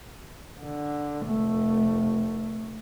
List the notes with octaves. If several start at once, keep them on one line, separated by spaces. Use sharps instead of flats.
D3
F1 A3